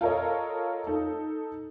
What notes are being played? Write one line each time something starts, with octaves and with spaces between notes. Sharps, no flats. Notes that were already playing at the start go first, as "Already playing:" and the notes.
F4 A4 A#4 C#5 D#5
D#4 A4